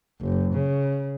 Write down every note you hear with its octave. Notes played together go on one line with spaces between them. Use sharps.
F#1
C#3